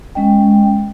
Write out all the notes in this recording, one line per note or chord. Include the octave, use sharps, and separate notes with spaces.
G#3 C#4 D#5 G5